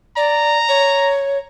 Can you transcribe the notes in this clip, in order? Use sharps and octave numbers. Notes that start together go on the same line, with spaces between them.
D5 A#5
C#5